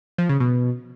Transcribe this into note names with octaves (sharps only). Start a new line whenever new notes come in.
F3
C#3
B2